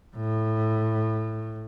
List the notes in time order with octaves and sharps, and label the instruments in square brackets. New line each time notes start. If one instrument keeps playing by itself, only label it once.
[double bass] A2